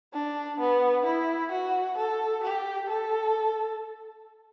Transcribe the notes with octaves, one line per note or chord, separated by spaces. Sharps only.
D4
B3
E4
F#4
A4
G4
A4